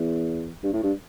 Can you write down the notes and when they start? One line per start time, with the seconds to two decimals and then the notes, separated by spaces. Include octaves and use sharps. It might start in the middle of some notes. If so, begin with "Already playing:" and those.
Already playing: E2
0.64 G2
0.73 A2
0.83 G2